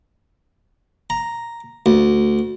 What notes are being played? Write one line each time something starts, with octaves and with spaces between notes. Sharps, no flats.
A#5
D2